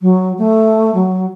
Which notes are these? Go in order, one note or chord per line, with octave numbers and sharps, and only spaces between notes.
F#3
A3
F#3